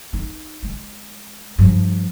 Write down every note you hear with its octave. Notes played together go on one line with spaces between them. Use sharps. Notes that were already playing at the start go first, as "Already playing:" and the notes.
D#4
G#3
G2 F3